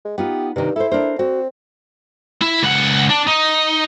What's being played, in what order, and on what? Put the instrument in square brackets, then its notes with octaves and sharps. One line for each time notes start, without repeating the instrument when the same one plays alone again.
[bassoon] G#3
[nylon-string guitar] B3 D#4 F4 [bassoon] G4
[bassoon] G2 [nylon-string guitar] C3 D#3
[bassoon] E4 [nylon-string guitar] A4 C5
[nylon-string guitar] D4 A#4 C5
[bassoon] C4 [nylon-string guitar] F#4
[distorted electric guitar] E4
C#2 F#5
D4
D#4